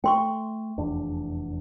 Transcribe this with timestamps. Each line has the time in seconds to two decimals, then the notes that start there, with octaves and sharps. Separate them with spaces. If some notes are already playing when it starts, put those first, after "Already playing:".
0.04 A3 G5 C6 C#6
0.78 F1 E2 D4